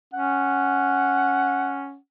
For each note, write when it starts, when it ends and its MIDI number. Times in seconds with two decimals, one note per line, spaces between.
0.13 1.96 61
0.13 1.97 78